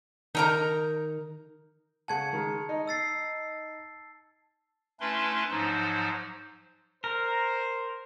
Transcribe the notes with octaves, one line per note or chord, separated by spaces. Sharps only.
D#3 D#4 A#4 A#5
C#3 F#5 A5 G#6 C#7
D#3 G#3
D#4
E6 A6 C7
A3 C#4 D4 E4 B4 C6
G#2 F3 F#3 D#4 C5
A#4 C5